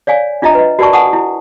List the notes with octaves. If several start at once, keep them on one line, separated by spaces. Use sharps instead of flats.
C#5 D5 F5 G#5
D4 F4 D#5 E5 A#5
B4 D#5
F#4 A#4 D5 A5 C#6
A4 F#5 G#5 A5 C#6 D#6
E4